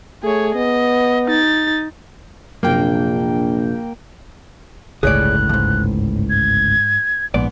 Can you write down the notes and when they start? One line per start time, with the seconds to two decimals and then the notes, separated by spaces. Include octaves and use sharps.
0.23 A3 G#4 C#5
0.55 B3 D#5
1.26 D#4 A6
2.63 A#1 F#2 C3 A#3 D4 G5
5.03 G1 C#2 A2 G#4 C#5 D5 F#6
5.49 F2 G#2
6.30 G#6
7.34 A#1 G#2 B3 D5